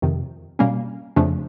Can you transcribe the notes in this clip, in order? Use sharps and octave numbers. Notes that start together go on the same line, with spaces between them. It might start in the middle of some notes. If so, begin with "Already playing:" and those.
F2 C3 D#3
B2 G3 A#3 C#4
F2 C#3 F3 A3 D4